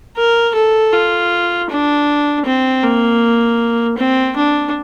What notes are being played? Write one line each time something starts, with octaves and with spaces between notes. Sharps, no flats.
A#4
A4
F4
D4
C4
A#3
C4
D4